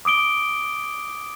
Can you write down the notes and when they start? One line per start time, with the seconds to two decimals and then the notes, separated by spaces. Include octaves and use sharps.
0.05 D6 D#6 D7 G7